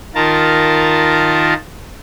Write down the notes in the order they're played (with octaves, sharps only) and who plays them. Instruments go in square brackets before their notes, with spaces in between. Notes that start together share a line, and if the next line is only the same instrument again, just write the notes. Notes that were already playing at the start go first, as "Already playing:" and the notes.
[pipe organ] D#3 F4 A#4 A5